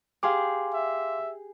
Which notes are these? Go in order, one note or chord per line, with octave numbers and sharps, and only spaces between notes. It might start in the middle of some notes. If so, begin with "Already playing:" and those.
G4 G#4 F5 C6 D6
E5